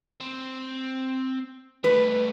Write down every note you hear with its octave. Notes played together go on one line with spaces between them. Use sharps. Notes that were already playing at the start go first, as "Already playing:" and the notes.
C4
G3 A3 B4